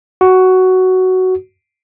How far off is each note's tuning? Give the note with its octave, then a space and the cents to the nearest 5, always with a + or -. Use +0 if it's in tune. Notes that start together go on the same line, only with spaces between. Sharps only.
F#4 +10